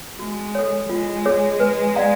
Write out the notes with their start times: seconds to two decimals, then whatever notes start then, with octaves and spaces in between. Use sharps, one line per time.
0.19 G#3 F#4
0.55 A4 C#5
0.89 G#3 F4
1.26 G#4 C#5
1.60 B4
1.95 D5 F5 A#5